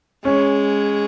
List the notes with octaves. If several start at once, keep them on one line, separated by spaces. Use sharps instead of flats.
G#3 C#4